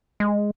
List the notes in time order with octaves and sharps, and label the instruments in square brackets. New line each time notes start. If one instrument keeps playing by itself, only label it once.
[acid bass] G#3